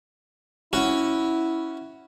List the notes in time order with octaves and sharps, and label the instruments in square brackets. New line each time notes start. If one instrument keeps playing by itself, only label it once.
[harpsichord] C#4 F#4 [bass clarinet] E4